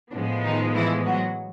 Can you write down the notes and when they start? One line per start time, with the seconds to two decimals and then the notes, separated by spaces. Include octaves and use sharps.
0.12 A2 F3 G#3 B3 D4
0.44 D#3 D#4
0.75 E3 E4
1.06 F#3 F#4